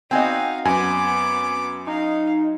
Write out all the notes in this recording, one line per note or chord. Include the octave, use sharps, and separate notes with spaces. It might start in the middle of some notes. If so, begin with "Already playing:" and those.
C4 D#4 F#4 D#5 F5 G5 G#5
F#2 B3 G#5 D6
D#4 F5